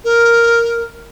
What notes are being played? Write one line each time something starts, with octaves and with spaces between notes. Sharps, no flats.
A#4